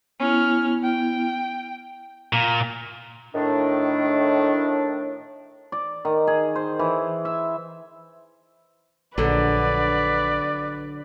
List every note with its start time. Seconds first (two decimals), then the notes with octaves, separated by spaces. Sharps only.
0.20 B3 C#4 E4 F6
0.83 G5
2.33 A#2
3.34 A2 D#3 D4
5.72 D5
6.05 D#3
6.27 G#4
6.55 C5
6.79 E3
7.25 E5
9.18 A#1 D3 F#3 B4 D5